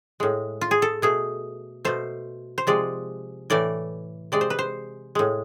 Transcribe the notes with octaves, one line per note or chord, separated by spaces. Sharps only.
A2 G#3
F4
G#4
A4
B2 A3 G#4
B2 A3 C5
C5
C3 F3 G#3 D5
A2 E3 A3 D5
C3 G#3 D5
C5
B4
C5
A2 G#3